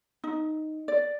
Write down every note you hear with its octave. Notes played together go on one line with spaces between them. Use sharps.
D#4
D5